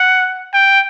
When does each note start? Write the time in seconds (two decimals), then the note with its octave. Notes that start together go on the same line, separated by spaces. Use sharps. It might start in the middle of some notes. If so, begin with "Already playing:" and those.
Already playing: F#5
0.54 G5